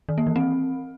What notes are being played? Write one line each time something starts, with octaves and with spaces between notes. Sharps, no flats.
D#3
A#3
E3
C4